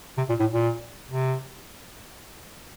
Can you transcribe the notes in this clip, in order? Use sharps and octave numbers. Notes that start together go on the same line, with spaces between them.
C3
A#2
A2
A#2
C3